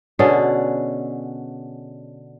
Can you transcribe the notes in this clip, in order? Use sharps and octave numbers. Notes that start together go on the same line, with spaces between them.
B2 D3 C#4 G#4